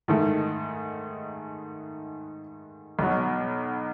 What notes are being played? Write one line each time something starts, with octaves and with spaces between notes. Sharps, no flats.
G#2 D#3 A3
B1 B2 F#3